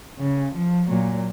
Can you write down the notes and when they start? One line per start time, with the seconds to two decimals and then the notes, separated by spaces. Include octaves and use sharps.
0.19 C#3
0.54 F3
0.88 A#2 F#3